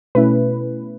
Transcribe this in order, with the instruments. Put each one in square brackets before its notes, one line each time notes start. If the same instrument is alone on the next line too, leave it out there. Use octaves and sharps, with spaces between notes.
[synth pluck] B2 A3 C#4 E4 B4